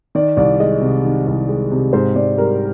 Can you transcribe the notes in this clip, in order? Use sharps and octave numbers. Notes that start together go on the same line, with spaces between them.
D#3 D5
C2 D5
G#3 D#5
C3
D#3
C2
G#3
C3
G#2 C5
G#2 D5
G3 A#4